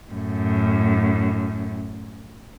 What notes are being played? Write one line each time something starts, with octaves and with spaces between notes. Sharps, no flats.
F#2 A2